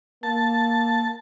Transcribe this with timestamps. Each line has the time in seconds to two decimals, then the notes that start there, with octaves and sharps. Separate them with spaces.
0.23 A#3 A5